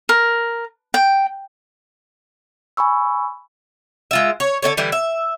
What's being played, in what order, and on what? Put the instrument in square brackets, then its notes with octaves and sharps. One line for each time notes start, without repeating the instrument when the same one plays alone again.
[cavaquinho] A#4
G5
[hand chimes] G#5 B5 C#6 E6
[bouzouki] G#3 F4 E5
C#5
D3 E4 A4 C#5
D3 E3 G3 E4
E5